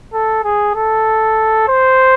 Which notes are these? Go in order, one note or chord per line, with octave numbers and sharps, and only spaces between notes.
A4
G#4
A4
C5